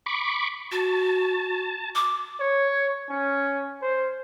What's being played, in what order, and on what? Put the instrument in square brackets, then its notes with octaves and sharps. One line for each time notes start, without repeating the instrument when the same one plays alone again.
[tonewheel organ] B5 C#6 D6
[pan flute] F#4 [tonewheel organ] A5
[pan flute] D6
[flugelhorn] C#5
C#4
C5